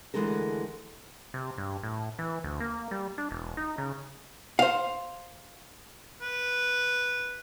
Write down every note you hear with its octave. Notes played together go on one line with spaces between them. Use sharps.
D2 G#2 E3 G#3 A4 A#4
C3
G2
A2
E3
D2
A#3
G3
D4
E1
D#4
C#3
C5 F5
B4